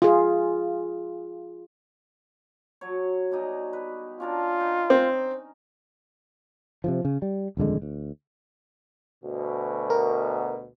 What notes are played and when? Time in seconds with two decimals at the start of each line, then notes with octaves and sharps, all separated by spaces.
0.02 F4 G#4
2.81 F#3 C#5
3.32 B2 G3 D#4
3.73 B4
4.20 C#4 D4 F4 A#4
4.61 D#4
4.90 C4
6.84 C3 D#3 F3
7.05 C#3
7.22 G3
7.57 D#1 F2 D3 G#3
7.82 D2
9.23 D2 B2
9.90 A#4